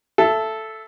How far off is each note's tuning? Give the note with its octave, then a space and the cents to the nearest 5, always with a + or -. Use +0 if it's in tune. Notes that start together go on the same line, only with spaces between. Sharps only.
A4 -5 E5 +20